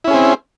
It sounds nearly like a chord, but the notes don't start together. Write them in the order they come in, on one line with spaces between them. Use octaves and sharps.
E4 C#4 G#4 C4